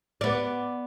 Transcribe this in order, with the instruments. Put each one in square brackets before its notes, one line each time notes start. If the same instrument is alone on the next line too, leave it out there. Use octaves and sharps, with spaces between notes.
[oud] B3 D5